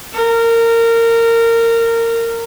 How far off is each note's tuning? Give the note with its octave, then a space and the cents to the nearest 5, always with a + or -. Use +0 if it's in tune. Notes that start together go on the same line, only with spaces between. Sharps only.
A#4 -20